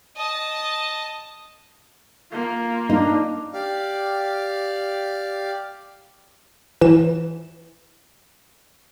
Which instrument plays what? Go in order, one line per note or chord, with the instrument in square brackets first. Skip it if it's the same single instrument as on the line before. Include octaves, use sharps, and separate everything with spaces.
[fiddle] D#5 A5
[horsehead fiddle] A#3 F4
[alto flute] D4 [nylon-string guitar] D#4
[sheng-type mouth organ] G4 D5 F5
[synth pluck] E3 E7